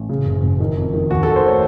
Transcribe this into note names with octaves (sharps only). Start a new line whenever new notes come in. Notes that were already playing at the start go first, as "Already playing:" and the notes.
Already playing: A1
C#3
F#1
F#1
D#3
F2
D#3
D#2 F#4
D#3 A4
C5
A3 C#5